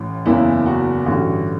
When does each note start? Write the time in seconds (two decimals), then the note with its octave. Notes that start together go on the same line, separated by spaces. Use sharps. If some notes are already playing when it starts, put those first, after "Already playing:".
Already playing: A1 A2
0.26 F#1 E2 C#3 E3 E4
0.66 F#4
1.06 A1 G2 D3 F#4